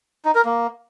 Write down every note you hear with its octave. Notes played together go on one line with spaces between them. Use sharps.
D#4
A#4
A#3